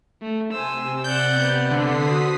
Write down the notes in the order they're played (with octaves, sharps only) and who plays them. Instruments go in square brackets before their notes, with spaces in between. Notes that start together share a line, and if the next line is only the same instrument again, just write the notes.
[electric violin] A3
[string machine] C3 [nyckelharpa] C5 G#5 [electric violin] E6
[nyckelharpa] D5 F#5 [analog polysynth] G6
[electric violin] B3
[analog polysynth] D3 [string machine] D#6 B6 C7
[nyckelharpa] F#4 C5